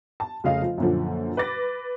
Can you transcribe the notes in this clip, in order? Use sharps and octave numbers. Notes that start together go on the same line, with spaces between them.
A5
F1 C#3 D#5 F5
F3
F#2 A#2 D3 F3
B4 D6 A6 A#6